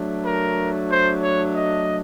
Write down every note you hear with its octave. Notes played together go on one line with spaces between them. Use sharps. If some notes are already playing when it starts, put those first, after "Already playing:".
Already playing: F#3 A3 D4
A#4
C5
C#5
D#5